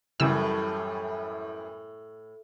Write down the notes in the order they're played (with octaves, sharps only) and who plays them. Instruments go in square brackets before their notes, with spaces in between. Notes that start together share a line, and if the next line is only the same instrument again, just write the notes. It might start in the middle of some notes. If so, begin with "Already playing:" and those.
[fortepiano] F#2 E3 G3 [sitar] A2 [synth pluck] C#3 E6